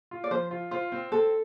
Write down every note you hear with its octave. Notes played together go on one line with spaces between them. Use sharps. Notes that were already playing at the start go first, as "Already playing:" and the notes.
F4
D5
F3 C5
F4
F4 C5
C4
C4 A4